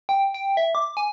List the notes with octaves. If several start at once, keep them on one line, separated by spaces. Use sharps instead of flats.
G5
G5
E5
D6
G#5